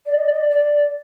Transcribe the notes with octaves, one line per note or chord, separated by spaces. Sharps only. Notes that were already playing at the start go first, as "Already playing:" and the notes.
D5
D#5
D5
D#5
D5
D5